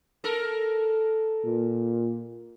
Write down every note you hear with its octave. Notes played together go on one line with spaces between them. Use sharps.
A4 A#4
A#2